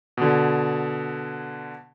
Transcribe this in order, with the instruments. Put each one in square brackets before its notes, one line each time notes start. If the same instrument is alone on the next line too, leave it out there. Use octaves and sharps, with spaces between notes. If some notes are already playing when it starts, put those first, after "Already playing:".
[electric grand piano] B2 D3